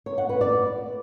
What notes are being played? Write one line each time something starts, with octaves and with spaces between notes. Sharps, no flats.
C#5
F#5
B4
D5